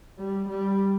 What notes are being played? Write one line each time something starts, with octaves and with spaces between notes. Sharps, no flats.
G3
G3